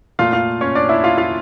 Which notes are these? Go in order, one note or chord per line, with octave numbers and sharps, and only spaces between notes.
A#2 A3 F4 F5
F4 F5
C#4 C#5
D4 D5
E4 E5
F4 F5
F4 F5